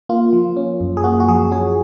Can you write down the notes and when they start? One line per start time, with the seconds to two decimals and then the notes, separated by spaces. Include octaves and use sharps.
0.09 A#3 F4
0.33 F3
0.57 C#4
0.81 F#2
0.97 G#4
1.04 A#3 F#4
1.20 F#4
1.28 F3 G#4
1.51 C#4 G#4